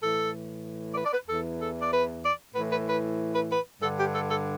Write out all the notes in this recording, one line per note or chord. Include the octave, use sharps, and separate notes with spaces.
A2 E3 A4
D5
B4
D5
B4
E2 E3 A4
A4
D5
B4
D5
A2 E3 B4
B4
B4
B4
B4
G2 D3 A4
G4
A4
A4